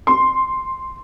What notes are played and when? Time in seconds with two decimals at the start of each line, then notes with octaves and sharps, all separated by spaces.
0.07 C6